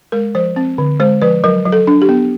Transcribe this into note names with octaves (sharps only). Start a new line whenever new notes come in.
G#3 A#4
F3 C5
C4
D3
G#3 C5
F3 B4
F#3 A#4
F#3
A4
D4
G4
B3